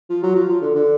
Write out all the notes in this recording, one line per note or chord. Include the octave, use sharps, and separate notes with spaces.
F3
F#3
F3
F3
D3
D3